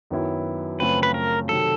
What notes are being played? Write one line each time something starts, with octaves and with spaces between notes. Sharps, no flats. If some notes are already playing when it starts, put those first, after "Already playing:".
F#2 D#3 F#3 B3 E4
F#2 C#3 F3 A3 C4 B4
B4
A#4
C3 D#3 F#3 A4